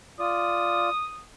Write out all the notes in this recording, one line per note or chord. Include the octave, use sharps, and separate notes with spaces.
F4 D5 D#6